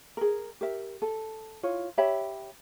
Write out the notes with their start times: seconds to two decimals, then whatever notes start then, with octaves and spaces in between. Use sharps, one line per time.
0.17 G#4 A#4
0.61 G4 A#4 E5
1.02 A4
1.63 E4 F4 C#5
1.98 G4 C#5 E5 B5